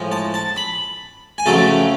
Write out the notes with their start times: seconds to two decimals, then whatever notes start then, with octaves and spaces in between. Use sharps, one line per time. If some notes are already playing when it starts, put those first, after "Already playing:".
Already playing: A2 F3 G#3
0.12 A5
0.34 A5
0.56 B5
1.38 G#5
1.46 F2 C#3 F#3 A3 A5